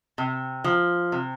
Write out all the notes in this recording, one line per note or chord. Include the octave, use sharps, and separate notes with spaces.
C3
F3
C3